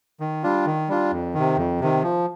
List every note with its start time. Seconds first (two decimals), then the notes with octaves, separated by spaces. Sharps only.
0.20 D#3
0.43 G3 D4 F4
0.66 D#3
0.89 G3 D4 F4
1.12 F2
1.34 C3 D#3
1.57 F2
1.80 C3 D#3
2.03 F3